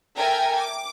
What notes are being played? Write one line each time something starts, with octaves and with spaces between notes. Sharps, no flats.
A4 A#4 E5 G5 G#5 A#5
D6